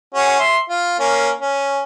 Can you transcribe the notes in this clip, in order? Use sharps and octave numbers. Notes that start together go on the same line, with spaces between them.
C#4 F#4 G#4
E5 C6
F4
A#3 C#4
C#4